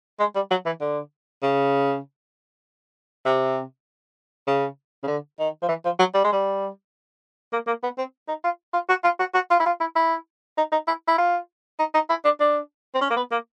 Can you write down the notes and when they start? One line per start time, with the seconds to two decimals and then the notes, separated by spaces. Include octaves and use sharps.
0.19 G#3
0.35 G3
0.51 F#3
0.66 E3
0.81 D3
1.42 C#3
3.26 C3
4.47 C#3
5.03 C#3
5.07 D3
5.39 D#3
5.62 F3
5.68 E3
5.85 F3
5.99 F#3
6.14 G3
6.24 G#3
6.32 G3
7.52 A#3
7.67 A#3
7.83 B3
7.98 C4
8.28 D#4
8.44 F4
8.73 F4
8.89 F#4
9.04 F4
9.19 F#4
9.34 F#4
9.50 F4
9.60 E4
9.66 F4
9.80 E4
9.96 E4
10.57 D#4
10.72 D#4
10.87 E4
11.08 E4
11.18 F4
11.79 D#4
11.94 D#4
12.09 E4
12.24 D4
12.40 D4
12.95 C4
13.01 C#4
13.10 A#3
13.16 B3
13.31 A#3